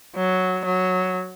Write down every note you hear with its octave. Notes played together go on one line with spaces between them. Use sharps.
F#3
F#3